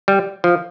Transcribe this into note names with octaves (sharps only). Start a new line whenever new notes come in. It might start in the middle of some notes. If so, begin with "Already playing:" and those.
G3
F3